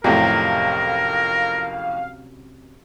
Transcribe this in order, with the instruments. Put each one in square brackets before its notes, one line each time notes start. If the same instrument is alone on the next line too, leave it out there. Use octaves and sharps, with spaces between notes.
[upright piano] F2 A2 [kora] C3 F#3 C#4 [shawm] A#4 [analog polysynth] F5